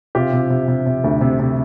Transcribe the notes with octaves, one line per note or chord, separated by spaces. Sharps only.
C3 F4 G4
C3
C3
C3
C3
D2
C3
C3